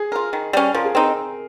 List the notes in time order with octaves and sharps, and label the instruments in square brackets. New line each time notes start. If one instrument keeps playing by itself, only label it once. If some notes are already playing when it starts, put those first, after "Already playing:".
Already playing: [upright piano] G#4
[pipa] F4 A#4
D#3
G3 C#4
[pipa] F3 [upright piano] A#4
[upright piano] G#4
[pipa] C4 D#4 [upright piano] A#4